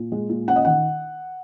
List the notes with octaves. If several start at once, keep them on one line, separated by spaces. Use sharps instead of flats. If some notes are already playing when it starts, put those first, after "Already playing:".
Already playing: A#2
G#3
A#2
C#4 F#5
D#5
D#3 F#5